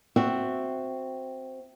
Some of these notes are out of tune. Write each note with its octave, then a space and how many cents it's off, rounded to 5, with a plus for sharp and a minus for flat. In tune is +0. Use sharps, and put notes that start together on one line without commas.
C4 +0 F#4 +0 E5 +0